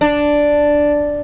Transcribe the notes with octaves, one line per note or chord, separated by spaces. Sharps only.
D4